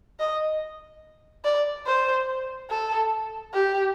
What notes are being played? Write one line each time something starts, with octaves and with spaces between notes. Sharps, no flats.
D#5
D5
C5
A4
G4